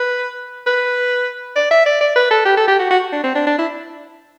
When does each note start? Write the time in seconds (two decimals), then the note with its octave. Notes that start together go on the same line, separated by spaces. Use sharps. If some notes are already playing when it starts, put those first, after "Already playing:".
Already playing: B4
0.67 B4
1.56 D5
1.71 E5
1.86 D5
2.01 D5
2.16 B4
2.31 A4
2.45 G4
2.57 A4
2.68 G4
2.79 F#4
2.91 F#4
3.13 D4
3.24 C4
3.35 D4
3.47 D4
3.58 E4